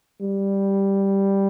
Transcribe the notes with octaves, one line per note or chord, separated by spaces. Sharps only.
G3